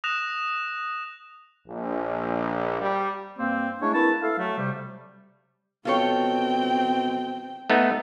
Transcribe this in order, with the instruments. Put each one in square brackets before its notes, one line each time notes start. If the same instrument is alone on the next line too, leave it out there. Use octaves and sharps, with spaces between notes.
[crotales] D#6 F#6 A#6 E7 F7
[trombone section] A#1
G3
[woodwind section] G2 A#3 C4
G#3 A3 D4 E4 C#5
A#3 C4 E4 B4 A5
E4 A4 F5
F#3 A3
C3 G3
[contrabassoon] B2 [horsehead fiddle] C4 G5 [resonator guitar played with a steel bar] F4 A4 C#5
[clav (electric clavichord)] A3 B3 D#4